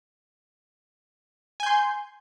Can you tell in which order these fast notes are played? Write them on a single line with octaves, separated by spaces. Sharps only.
G#5 G6 C6